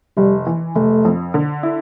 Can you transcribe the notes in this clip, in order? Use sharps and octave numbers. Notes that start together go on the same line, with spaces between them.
F1 G3
E3
F1 A3
F2
D3
E4